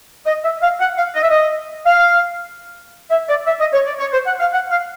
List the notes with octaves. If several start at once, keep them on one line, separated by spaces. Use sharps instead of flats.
D#5
E5
F5
F#5
F5
D#5
E5
D#5
F5
E5
D5
E5
D#5
C#5
D5
C#5
C5
F#5
F5
F#5
F5